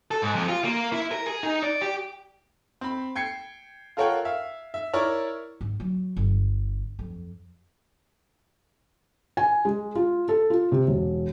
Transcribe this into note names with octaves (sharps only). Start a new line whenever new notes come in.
A4
G#2
F2
F4
A#3
E4
A#4
G#4
D#4
D5
G4
C4 B5
G5 G#6 C7 C#7
F4 A4 A#4 C#5 F#5 G5
E5 F5
E5
E4 A#4 C#5 D5
G#1
F#3
G1
F2
G#5
G#3
F4
A4
F4
C3
E1